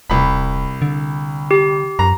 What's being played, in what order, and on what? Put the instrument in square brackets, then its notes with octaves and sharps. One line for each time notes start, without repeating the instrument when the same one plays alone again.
[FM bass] D#1 [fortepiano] C2 B5
[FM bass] D3
[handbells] G4
[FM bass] F#2 [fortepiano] A#5